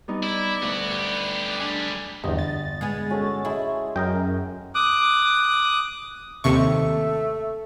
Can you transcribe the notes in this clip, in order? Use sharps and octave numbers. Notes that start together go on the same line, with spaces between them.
G3 B3 D#4
E4 D5
D2 B3 F#4
B3 G4
G3 D4 G#4
G1 E2 G2 D#5
A6
G#3 B3 G#4
C#4 F#4 A4
G#3 E4 G#4
F#2 A#4 D#5 G5
D6 D#6 F#6
D#2 C3 A3 C#6